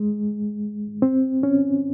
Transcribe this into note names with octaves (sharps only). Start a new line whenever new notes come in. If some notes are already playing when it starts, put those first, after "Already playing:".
Already playing: G#3
C4
C#4